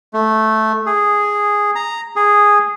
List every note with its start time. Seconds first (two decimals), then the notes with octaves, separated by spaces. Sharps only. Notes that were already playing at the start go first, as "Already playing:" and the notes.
0.14 A3
0.86 G#4
1.75 A#5
2.16 G#4